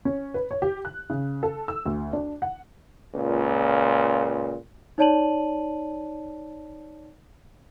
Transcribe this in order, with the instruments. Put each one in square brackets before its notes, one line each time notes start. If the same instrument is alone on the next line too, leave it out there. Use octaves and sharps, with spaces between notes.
[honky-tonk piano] C#4
B4
C#5
G4
F#6
C#3
A4
E6
D2
D4
F#5
[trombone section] C#2 A#2
[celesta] D#4 C#5 D5 A5 D#7 F#7